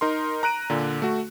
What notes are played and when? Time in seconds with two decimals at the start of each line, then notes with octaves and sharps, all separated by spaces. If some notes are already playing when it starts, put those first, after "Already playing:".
0.01 D#4 A#4 C6
0.43 A#5 F#6 D7 D#7
0.70 A#2 D3
1.02 A3 F#4